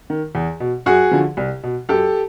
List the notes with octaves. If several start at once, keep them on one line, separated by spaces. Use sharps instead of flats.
D#3
E2
B2
F#2 F#4 G#4
D3 F3
C2
B2
F#2 G4 A4